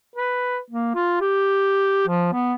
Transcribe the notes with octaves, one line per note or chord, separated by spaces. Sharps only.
B4
A#3
F4
G4
F3
B3